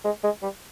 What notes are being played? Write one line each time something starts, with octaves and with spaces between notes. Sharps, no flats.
G#3
G#3
G3